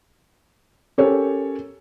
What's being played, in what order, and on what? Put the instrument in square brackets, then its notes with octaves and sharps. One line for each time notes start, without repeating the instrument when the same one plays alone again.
[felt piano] C#4 G4 A4 A#4 C#5